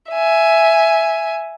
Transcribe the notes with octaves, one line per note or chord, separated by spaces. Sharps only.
E5 G#5